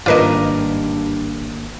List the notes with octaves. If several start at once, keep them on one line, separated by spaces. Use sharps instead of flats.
G#1 G2 A#3 D4 F4 A#4 B4 D#5